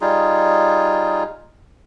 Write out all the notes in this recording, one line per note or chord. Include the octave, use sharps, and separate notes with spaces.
G3 D#4 F4 G#4